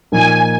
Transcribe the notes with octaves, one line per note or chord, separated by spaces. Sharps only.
A#2 F3 A#3 D#4 G#5